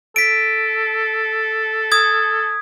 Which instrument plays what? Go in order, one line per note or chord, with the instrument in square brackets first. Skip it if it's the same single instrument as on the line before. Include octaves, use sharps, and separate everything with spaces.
[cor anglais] A4 [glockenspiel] B6 D7
[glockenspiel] D#6 G#6